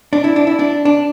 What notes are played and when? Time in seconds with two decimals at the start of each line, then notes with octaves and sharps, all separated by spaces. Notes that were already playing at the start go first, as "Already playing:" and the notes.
0.13 D4
0.24 E4
0.36 D4
0.47 E4
0.59 D4
0.85 D4